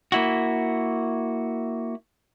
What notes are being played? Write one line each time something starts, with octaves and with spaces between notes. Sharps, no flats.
A#3 E4 F#4